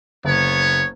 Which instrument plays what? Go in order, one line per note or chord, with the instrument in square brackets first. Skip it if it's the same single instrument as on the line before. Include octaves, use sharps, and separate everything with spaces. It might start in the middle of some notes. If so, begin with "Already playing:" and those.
[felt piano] F#1 [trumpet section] B3 C#5